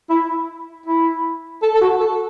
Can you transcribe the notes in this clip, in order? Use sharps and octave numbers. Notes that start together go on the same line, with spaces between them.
E4
E4
A4
A4
F#4
A4